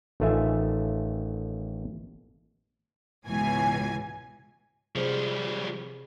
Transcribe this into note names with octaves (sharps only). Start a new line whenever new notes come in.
A1 D#3 A3 F4 E5 G#5
G#1 C#2 B2 E3 G#5
C3 F3 G3 G#4 C5